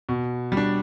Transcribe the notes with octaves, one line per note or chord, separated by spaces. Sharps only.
B2
G3
D4